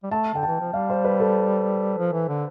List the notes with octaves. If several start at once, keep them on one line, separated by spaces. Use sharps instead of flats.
G3
A3 A5
D3 G5
E3 A5
F3
G3 F5
C5
B4
A4
F3
E3
D3